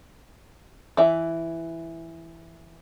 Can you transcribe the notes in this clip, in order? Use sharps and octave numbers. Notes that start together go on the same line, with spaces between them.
E3 E5